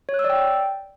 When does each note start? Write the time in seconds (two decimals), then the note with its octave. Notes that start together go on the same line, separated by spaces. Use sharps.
0.09 C#5
0.14 F#6
0.19 E6
0.24 D5
0.30 G5